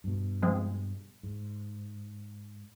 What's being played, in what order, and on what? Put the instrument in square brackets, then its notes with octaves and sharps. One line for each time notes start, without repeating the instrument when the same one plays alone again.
[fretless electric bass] G2 B2
[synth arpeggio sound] F3 G#3 C4
[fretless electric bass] G#2